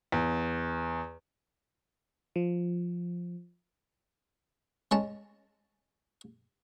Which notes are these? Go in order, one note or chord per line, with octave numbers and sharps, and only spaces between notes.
E2
F3
G#3 C#4 A5